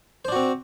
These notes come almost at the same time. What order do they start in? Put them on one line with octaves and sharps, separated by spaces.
C5 D4 F#4 C4